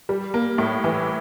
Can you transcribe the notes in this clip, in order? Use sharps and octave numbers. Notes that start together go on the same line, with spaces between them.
G3
A#3
A2
E3